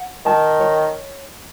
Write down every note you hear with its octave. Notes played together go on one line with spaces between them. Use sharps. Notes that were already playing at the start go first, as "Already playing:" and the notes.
Already playing: F#5
D#3 A5
C#5